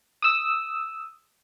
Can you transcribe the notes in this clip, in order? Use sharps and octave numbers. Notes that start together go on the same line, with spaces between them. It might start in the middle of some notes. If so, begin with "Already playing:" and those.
D#6 E6